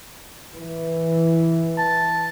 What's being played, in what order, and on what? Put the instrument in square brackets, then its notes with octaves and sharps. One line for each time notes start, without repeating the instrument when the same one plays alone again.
[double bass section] E3
[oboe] A5